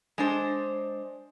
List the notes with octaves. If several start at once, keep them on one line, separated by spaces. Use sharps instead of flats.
G#3 D4 C5